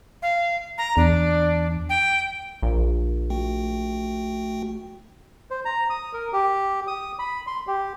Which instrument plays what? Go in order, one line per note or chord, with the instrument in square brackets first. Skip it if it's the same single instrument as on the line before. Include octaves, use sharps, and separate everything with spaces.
[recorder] F5
A#5
[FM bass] E2 [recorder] D4
[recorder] G5
[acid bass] A#1
[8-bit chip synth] A3 F#4 G5
[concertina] C5
A#5
D#6
A#4
G4
D#6
B5
C6
G4